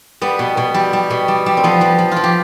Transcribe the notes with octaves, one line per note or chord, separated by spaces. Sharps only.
G3 B3
B2
B2
G3
G3
B2
G3
G3
C4
F3 B3
F3
F3
F3 F4
G4